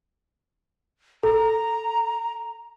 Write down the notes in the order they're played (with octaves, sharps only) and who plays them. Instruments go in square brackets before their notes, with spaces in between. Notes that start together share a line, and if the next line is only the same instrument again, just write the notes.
[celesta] A4 [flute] A#5